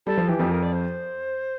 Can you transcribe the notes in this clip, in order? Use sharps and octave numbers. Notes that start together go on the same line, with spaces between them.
G3 A4
F3
E3 G4
F2 F3
A#4
D5
C5